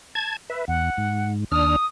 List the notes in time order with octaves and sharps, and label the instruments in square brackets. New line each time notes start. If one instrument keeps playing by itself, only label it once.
[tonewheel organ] A5 G#6
B4 E5
[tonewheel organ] E2 [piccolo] F#5
[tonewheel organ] G#2
[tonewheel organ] D#2 D4 F6 [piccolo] D#6